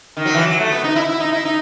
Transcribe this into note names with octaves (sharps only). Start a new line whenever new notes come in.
D#3
F#3
E3
F#3
A3
B3
D#4
E4
E4
D#4
E4
D#4